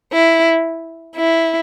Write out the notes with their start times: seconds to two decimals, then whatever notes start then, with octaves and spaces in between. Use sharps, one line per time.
0.13 E4
1.16 E4